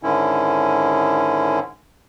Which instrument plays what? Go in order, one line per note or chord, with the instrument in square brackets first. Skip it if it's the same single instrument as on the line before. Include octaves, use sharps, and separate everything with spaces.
[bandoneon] G#2 D3 D#3 C#4 E4